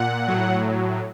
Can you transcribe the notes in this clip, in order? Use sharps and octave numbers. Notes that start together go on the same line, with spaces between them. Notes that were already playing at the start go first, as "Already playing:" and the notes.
Already playing: A#2 F#5
A2 F#3